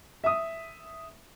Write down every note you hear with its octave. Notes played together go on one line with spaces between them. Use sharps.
E5 D#6